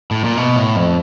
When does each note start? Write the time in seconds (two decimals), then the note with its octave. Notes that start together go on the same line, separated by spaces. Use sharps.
0.11 A2
0.24 A#2
0.37 B2
0.56 A2
0.76 F2